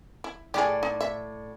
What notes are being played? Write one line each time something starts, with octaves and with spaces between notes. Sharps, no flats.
E4
A2 G4 G#4 D5
D#4
E5